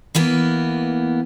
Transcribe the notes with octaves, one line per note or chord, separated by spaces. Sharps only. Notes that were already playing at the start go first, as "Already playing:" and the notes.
E3 A#3 B3